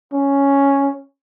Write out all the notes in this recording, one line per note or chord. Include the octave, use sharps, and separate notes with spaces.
C#4